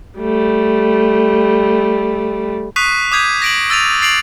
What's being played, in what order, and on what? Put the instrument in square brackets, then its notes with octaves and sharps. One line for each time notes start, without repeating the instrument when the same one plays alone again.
[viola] G3 A3
[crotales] C#6 D#6 F#6 B6 C7 D#7
D6 D#6 G6 G#6 B6 D#7
A#6 D7 F#7
E6 A6 D#7 F7
A6 C7 D7 F7 F#7